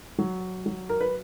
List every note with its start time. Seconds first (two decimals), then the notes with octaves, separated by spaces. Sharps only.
0.18 F#3
0.66 F#3
0.89 A#4
1.01 B4